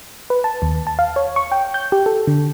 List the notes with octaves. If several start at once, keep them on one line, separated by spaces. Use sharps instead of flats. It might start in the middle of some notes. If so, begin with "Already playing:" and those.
B4
A5
D#2
A5
F5
C#5
C#6
G5
G6
G4
A4
D3